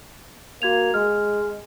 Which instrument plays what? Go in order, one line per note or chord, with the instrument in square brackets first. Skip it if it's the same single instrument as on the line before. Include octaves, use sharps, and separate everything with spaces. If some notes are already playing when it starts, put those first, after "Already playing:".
[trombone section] A#3 [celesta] F#4 G#6 F7
[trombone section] G#3 [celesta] F6